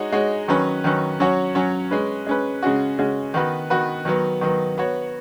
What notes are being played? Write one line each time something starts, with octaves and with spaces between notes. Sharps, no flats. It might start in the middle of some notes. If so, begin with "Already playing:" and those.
Already playing: G#3 D#4 F#4 C#5
G#3 D#4 F#4 C#5
D#3 F#3 C#4 B4
D#3 F#3 C#4 B4
F#3 C#4 F#4 C#5
F#3 C#4 F#4 C#5
G#3 C#4 B4
G#3 C#4 B4
C#3 G#3 C#4 F#4
C#3 G#3 C#4 F#4
D#3 B3 F#4 B4
D#3 B3 F#4 B4
D#3 F#3 B3
D#3 F#3 B3
B3 F#4 C#5